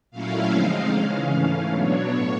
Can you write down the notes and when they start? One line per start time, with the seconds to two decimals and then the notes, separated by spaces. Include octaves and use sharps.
0.11 A#2 F#3 A3 C#4 E4 F5
0.51 D3 F3 G#3 C4 D#4
0.90 C#3 E3 G#3 C#4
1.30 G#2 E3 A3 C#4
1.70 B2 F#3 B3 D4 C#5
2.09 A2